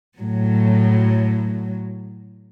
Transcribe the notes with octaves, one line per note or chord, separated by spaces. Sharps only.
A2 F#3